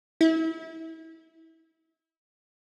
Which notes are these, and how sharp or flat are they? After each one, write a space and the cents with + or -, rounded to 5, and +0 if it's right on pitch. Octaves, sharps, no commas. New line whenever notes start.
E4 -30